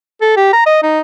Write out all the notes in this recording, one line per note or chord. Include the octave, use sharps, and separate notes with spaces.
A4
G4
A#5
D#5
D#4